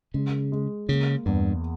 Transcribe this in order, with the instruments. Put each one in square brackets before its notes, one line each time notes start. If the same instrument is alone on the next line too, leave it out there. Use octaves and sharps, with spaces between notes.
[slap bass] C#3 [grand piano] G#3
[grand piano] G#3
[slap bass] C#3 [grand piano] A#3
[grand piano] E2 [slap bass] G2